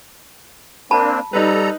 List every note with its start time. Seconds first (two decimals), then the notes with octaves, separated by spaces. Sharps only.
0.91 A#3 C4 D4 A5 B5
1.33 G3 D#4 A4 B4 A#5